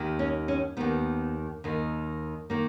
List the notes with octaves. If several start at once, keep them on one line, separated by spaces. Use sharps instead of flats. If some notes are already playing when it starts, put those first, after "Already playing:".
Already playing: D#2 D#3
C#4
C#4
D#2 D#3 B3
D#2 D#3
D#3 A#3